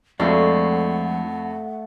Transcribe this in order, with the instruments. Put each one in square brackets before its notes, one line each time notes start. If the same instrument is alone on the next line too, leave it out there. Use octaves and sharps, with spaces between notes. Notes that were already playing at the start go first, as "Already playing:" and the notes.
[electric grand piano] F2 [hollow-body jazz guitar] F3 G#3 D4 [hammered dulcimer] A3 [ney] F#5